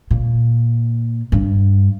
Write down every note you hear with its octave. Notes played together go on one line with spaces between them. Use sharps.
A#2
G2